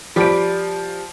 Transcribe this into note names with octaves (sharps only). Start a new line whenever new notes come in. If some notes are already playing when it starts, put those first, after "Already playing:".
F3 G4 B4 D5 D7